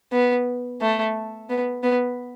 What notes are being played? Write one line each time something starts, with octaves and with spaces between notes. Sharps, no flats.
B3
A3
B3
B3